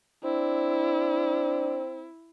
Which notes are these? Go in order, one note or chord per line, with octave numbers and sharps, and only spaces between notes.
C4 D4 E4